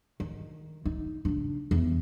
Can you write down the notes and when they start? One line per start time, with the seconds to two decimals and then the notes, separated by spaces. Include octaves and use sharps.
0.20 D#3
0.85 D#4
1.25 C#3 D4
1.71 E2